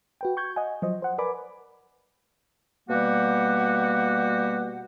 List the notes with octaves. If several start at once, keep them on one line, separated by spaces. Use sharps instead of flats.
F#4 B4 G5
C#6 G6 G#6
D#5 F#5 G#5
F3 F#3 C5 D#5
C5 F#5
A#4 B4 D5 G#5 B5 D6
B2 G3 A#3 F#4 G4 F#5